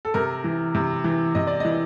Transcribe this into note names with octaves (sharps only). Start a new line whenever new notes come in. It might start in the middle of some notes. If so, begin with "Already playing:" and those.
A4
C3 A#4
E3
C3
E3
C3 D#5
D5
E3 D#5